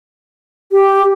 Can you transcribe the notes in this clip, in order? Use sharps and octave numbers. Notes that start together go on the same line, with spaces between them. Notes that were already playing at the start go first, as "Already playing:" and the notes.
G4